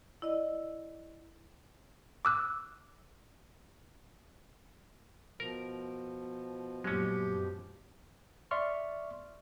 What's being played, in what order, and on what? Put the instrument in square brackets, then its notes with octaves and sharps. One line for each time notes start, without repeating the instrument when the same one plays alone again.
[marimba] E4 D5 D#5
[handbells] D6 E6 F#6
[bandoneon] B2 F3 [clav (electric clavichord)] A#4
[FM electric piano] F#2 A#2 [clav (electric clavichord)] G#3 C#4 [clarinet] G4
[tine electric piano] D5 E5 C6 C#6 F6